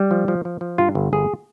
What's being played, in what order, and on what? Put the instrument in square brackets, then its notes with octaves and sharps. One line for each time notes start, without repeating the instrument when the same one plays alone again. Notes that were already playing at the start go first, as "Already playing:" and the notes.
Already playing: [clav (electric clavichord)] G3
F3
F3
F3
F3
G2 F4
G1
G1 G#4